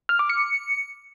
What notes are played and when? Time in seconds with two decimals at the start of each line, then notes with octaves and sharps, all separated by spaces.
0.09 F6
0.19 D6
0.29 C#7